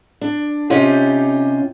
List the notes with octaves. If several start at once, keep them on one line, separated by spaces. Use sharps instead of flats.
D4
C3 C#4 D#4 F4 G4